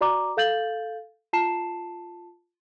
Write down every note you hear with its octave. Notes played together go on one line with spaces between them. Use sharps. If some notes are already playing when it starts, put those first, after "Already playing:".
F#4 D5 A#5 D6
A4 F5 G6 A6 F#7
F4 A5 C7 E7